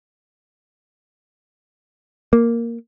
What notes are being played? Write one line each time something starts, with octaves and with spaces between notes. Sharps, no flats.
A#3